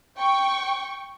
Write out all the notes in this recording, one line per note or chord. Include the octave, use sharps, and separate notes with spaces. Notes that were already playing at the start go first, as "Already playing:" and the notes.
G5 C#6